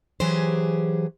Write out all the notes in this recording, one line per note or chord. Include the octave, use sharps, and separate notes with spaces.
E3 F#3 G4 G#4 C5